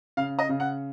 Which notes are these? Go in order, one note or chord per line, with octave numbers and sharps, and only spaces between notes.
C#3 F5
D#5
C#3
F#5